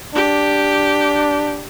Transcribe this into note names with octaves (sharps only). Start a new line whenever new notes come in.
D4 G4